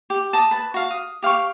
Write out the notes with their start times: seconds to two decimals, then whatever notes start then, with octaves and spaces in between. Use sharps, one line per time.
0.10 G4
0.33 A5 A#5 D#6
0.51 B4 A5
0.74 F#4 F5
0.91 D#6
1.23 G4 F5 G5 C#6